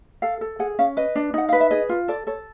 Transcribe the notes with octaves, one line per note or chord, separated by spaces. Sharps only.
A4 F5
A4
G#4 F#5
C#4 F5
B4 D#5
D4
D#4 F#5
B4 F5
E5
G#4 D#5
F4
A4 D5
A4 C#5